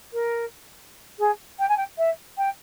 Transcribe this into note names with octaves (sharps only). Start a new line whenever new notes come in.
A#4
G#4
G5
G#5
G5
E5
G5